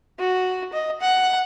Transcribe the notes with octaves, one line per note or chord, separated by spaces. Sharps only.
F#4
D#5
F#5